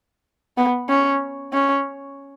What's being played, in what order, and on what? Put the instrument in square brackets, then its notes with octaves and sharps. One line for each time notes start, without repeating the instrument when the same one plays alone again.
[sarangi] B3
C#4
C#4